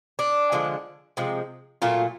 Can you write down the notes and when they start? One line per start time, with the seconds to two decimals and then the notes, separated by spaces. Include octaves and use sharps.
0.19 D4
0.52 D3 F3 G#3
1.17 C3 F3 G#3
1.82 A#2 F#3 A3 F4